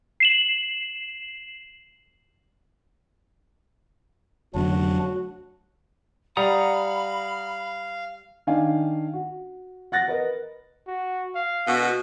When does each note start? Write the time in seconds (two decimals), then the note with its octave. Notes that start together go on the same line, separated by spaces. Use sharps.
0.20 C7 E7 F#7
4.54 F1 D3 F#3 A3 D4 F#4
6.37 G3 F5 F#5 A#5 B5 D#6
8.47 D#3 D4 F5 G#5
9.13 F#4
9.92 F#5 F#6 A6 A#6
10.08 A#4 B4 D#5
10.87 F#4
11.35 F5
11.67 B2 F#4